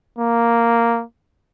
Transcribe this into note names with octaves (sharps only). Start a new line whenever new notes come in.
A#3